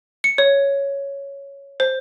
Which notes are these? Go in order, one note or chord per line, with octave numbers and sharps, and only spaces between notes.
C#7
C#5
C5